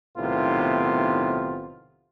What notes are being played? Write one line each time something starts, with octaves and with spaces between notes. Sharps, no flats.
B1 A2 C3 D#3 B3 F4